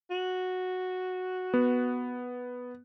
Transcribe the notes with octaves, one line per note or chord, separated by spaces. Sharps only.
F#4
B3